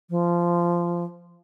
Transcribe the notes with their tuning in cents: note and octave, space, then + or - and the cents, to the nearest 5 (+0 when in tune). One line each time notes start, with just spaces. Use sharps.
F3 -15